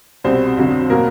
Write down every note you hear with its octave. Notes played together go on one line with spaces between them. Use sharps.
C2 B2 G3 C4 C5
F2 D3 F#3
B2 F#3 A#3 A#4